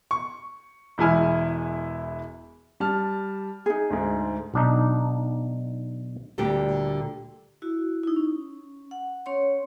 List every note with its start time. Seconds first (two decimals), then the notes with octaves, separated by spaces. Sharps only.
0.11 C#6
0.98 E1 E3 G#3 E4 G#5 F6
2.80 G3 A5 F6
3.66 D#4 G#4
3.90 D2 G#2
4.54 B1 D4 D#4
6.38 D2 A#2 D3 G3 G4 G5
7.62 E4 F#4
8.03 D#4 E4
8.16 C#4
8.91 F#5
9.26 C#4 C#5 C6